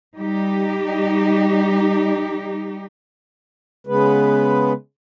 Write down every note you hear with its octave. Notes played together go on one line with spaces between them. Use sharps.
G3 D#4 G4
C#3 G#3 B3 B4